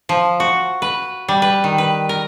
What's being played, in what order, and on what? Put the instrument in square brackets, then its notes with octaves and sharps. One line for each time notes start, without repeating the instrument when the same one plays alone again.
[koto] F3
F#4
B4
G3
B4
D#3
B4
A#4